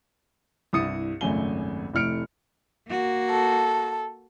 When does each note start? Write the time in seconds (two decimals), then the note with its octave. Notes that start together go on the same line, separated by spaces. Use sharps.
0.73 C2 G2 E4 D#6 A6 C#7
1.21 G#1 C#2 F#2 A3 G#5 G7
1.93 F1 A2 A3 F6 C#7 D7
2.89 A#3 F#4
3.30 A4